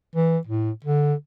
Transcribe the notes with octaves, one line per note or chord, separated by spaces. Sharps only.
E3
A2
D3